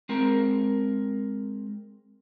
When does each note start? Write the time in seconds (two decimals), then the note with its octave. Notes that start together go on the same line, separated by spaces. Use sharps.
0.09 G#3 C4 A#4